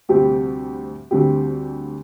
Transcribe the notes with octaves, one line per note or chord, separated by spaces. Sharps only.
D2 C3 G3 C4 G4
D2 D3 G3 C4 G4